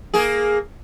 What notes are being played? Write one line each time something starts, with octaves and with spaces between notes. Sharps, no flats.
A#3 G#4